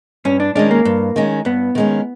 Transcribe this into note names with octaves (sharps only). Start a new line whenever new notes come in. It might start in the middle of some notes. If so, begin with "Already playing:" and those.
G2 C#4
D4
D#3 G#3 C#4 D4
A#3
G2
D#3 G#3 C#4
G2 B3
D#3 G#3 C#4